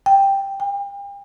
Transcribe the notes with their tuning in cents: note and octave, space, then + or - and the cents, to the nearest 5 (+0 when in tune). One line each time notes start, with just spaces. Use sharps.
G5 +5
G5 +40